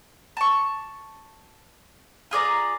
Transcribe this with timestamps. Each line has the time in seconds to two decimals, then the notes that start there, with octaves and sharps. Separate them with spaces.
0.37 A5 C#6
2.31 F4 G#4 D5 A#5